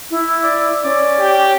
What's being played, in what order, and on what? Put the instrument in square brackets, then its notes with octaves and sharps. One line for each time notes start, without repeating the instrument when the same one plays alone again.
[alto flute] E4
[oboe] D5
[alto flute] C#4 [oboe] D5
[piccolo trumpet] G4